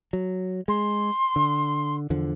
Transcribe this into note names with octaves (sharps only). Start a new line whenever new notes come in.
F#3
G#3 C6
D3
E2 D3 F3